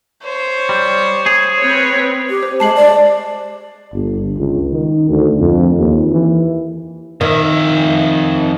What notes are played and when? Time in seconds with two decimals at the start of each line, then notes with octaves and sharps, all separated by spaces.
0.23 C5 C#5
0.69 G3
1.26 G#4
1.59 C4 B4 C#5
2.30 G4
2.43 C5
2.60 G#3 A5 C7 F#7
2.76 D5
3.93 G1
4.38 C#2
4.71 D#3
5.09 D2
5.40 F2
5.78 D#2
6.10 E3
7.21 F2 D#3 E5